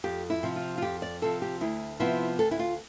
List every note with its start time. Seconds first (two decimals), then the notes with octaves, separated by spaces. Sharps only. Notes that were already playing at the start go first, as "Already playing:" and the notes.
0.04 F2 G4
0.30 E4
0.43 C3 F3
0.56 F4
0.78 F4
0.82 F2 G4
1.02 D5
1.22 C3 F3 A4
1.42 G4
1.61 D2 E4
1.99 C3 F3 B3 E4
2.39 D2 A4
2.51 E4
2.59 F4